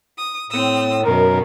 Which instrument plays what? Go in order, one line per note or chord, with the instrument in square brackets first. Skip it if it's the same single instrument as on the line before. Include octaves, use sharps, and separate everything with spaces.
[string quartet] D#6
[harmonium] A2 [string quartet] C4 D#6 E6
[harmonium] F#2 A#4 [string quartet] B2 D#3